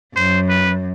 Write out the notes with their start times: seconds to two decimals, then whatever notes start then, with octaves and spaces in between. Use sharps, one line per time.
0.16 F#2 C5
0.49 B4